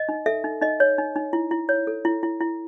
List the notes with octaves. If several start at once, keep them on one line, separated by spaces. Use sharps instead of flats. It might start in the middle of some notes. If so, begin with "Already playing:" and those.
Already playing: D#5
D#4
A4 E5
D#4
D#4 D#5
C#5
D#4
D#4
E4
E4
C#5
A4
E4
E4
E4